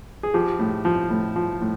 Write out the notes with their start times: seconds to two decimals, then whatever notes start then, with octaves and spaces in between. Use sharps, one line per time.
0.23 G#4
0.34 F3 G4
0.59 A2
0.85 F3
1.10 A2
1.36 F3
1.61 A2